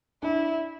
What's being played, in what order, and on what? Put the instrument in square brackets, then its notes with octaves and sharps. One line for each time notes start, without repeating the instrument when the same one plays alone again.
[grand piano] D4 [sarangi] E4